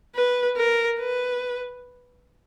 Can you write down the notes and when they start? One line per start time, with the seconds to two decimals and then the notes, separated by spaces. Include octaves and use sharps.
0.16 B4
0.57 A#4
0.99 B4